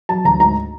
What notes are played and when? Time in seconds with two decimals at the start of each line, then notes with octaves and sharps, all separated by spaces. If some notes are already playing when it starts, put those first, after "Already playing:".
0.09 F#3 A5
0.25 D2 A#5
0.40 G#2 A#5